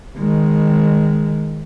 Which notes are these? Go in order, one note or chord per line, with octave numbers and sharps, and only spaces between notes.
D#3 G#3